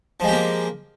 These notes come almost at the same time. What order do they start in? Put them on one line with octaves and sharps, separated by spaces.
F3 G#3 G4 A#3